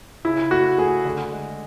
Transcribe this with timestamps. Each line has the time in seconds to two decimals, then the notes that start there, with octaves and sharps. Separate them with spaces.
0.25 C#3 E4
0.51 A3 F#4
0.78 A3 G#4
1.05 D3
1.32 G#3